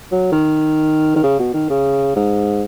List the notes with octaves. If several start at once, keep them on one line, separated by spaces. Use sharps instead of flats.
F#3
D#3
D#3
C#3
B2
D#3
C#3
G#2